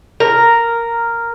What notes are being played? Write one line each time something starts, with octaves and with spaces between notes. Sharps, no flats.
A#4